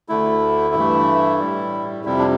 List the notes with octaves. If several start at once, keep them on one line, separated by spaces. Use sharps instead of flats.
D2 D3 A3 E4
G2 E3 A3
A2 G3
F2 C3 G3 E4
D4